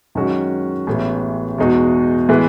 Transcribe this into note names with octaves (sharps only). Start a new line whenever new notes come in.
F#2 D#3 G#3 C#4 F#4
A1 A2 G#3 B3
E2 B2 G#3 D#4 F#4
A2 E3 G#3 B3